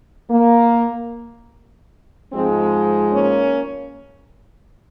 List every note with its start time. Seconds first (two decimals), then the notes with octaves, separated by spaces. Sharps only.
0.31 A#3
2.32 G#2 F3 G#3 C4
3.13 A#3 C#4